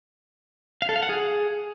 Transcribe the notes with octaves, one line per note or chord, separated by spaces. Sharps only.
F5
A4
F5
F#5
G#4